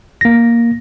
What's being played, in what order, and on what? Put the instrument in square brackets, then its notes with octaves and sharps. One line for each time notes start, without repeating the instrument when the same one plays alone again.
[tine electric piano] A#3 A#6